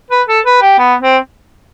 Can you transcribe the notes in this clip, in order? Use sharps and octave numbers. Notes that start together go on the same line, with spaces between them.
B4
A4
B4
G4
B3
C4